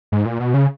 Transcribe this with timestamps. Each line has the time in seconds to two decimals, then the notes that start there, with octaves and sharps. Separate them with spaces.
0.12 G#2
0.26 A#2
0.40 B2
0.54 C#3